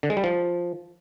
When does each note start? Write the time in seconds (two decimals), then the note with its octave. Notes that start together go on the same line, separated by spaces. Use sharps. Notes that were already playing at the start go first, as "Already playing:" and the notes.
0.03 D3
0.10 G#3
0.17 G3
0.24 F3